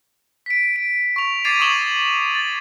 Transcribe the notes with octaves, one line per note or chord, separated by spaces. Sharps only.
B6 D7
D7
C#6 F7
D6 G#6 A6 C7 D#7 F7
C#6 D#6 E7 F#7 G7
A6